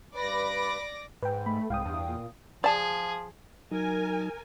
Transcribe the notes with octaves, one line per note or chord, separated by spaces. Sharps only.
G2 B4 D5 B5 D6 A#6
G#2 B4 G5
A3 B5
C2 G#2 F5 G5 D#6
E2 G2
A#2
F3 G#4 D5 A5
F#3 D#4 A#4 G#5